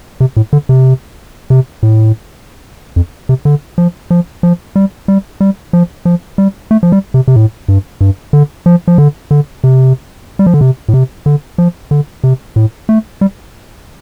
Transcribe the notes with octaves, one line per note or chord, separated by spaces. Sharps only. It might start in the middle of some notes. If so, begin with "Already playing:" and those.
C3
A2
D3
C3
C3
A2
F2
C3
D3
F3
F3
F3
G3
G3
G3
F3
F3
G3
A3
F3
G3
C3
C3
A2
G2
G2
D3
F3
F3
D3
D3
C3
G3
F3
D3
C3
A2
C3
D3
F3
D3
C3
A2
A3
G3